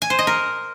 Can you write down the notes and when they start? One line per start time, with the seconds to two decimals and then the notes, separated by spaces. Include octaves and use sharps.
0.02 G#5
0.10 C5
0.19 D#5
0.27 A#4